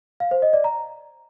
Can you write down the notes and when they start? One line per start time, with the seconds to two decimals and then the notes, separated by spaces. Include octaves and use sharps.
0.20 F5
0.31 C5
0.42 D#5
0.53 D5
0.64 A#5